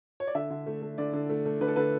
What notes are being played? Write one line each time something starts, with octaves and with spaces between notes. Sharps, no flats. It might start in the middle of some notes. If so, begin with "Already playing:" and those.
C#5
D5
D3 E5
D3
A3
A3
D3 D5
D3
A3
A3
D3 B4
A4
D3 B4